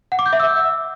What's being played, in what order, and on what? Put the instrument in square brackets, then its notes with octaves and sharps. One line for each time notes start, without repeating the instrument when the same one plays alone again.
[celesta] F#5
D6
G6
E5
E6